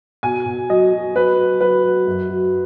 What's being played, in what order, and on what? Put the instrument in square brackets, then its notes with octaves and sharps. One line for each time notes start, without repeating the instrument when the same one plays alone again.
[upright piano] B2 G#5
B2
F#3 D#5
F#3
F#3 B4
F#3
F#3 B4
F#3
F#2
F#3